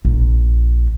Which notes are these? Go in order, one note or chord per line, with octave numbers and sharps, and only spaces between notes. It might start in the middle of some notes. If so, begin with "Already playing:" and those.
A#1